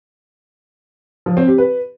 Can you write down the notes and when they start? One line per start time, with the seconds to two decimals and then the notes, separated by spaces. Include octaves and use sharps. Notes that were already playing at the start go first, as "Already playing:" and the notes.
1.26 F3
1.37 C4
1.48 G4
1.58 B4